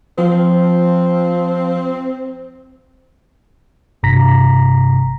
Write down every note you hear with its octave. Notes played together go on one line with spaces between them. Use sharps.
F3 C4
G#1 G2 C3 A#5 A#6 B6